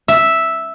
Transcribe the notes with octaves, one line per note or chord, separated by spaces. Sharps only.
E5